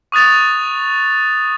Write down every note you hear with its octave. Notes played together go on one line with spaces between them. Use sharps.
C#6 D#6 F#6 A6 F7